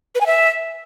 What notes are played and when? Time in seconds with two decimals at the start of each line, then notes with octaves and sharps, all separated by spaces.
0.15 B4
0.21 G#5
0.26 E5